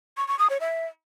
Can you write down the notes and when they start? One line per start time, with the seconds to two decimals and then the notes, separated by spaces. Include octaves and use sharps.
0.17 C#6
0.28 C#6
0.39 D#6
0.50 C#5
0.61 E5